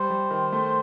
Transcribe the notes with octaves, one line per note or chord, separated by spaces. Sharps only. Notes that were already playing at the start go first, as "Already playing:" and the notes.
Already playing: G3 C5
G3
D#3
A3